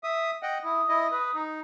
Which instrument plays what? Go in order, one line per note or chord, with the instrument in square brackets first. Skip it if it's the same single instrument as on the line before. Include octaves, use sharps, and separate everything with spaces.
[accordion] E5 D#6
D#5 F#5 G5
[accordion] E4 [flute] D#6
[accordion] E4 D#5
B4
D#4